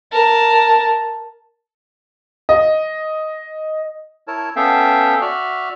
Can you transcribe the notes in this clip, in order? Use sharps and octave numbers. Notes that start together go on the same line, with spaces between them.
A#4 A5
D#5
E4 A#4 C#5 A5
B3 C#4 A4 E5 F5 G5
F#4 D5 E5 F6